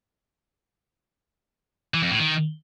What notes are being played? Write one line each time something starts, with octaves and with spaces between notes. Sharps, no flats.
E3
F2
A2
D#3